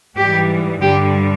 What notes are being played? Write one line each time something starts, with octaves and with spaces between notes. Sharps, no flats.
G#2 E3 G3 G4
G2 D3 G3 G4